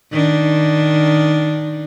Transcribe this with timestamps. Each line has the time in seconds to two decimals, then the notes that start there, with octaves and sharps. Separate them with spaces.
0.11 D#3 D4